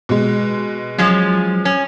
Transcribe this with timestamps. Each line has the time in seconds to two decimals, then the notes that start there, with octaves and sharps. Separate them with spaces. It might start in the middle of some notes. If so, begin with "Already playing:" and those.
0.09 B2 G#3
0.98 F3 F#3 G#3 C#4 F4
1.65 C#4